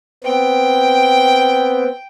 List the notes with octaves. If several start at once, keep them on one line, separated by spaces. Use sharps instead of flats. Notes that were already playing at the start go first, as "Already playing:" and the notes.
B3 C4 G5